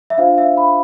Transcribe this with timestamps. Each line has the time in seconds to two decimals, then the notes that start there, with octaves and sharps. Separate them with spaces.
0.10 E5
0.18 D4 F4 C5 F5
0.38 E5
0.57 B5